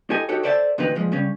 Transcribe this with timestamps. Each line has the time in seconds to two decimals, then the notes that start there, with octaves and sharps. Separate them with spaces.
0.10 E4 G4 A4 D#5 G#5
0.29 D#4 F#4 G4 A4 C#5
0.43 A4 C5 D5 E5 G5 A5
0.78 D2 A#2 E3 C4 D#4 B4
0.95 A#2 F3 G#3
1.12 C#3 G3 C#4